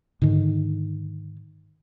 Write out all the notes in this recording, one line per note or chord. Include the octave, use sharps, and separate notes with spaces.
G#2 D3 D#3